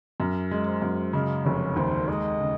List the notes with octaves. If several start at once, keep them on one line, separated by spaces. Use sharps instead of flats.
F#2
G#3
C5
F#2
C#3 D#5
F1 C#5
D#2 C5
G#3 D#5
C#3